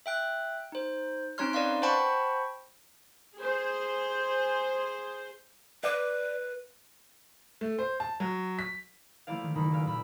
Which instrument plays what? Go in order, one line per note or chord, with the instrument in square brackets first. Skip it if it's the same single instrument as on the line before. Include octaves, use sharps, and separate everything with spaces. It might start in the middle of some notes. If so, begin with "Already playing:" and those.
[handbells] E5 G5 F#6
D#4 C5
C4 C#4 D#4 C#5 C6 F6
B4 D5 D#5 F5 C6
C5 F#5 G5 A5 B5 C#6
[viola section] G#4 C5
[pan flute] B4 [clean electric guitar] D5
[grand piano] A3
C5
A5
F#3
B6
[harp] F3 A3 A#3 E4 D5 F5
D#3
F#1 D#3 D#4 B5
G#4 A4 B4 D5 F5 F6
F#1 A#2 B5 E6